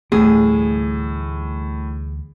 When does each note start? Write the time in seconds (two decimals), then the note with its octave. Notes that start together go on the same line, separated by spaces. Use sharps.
0.12 D2 A2 E3 G3 G#4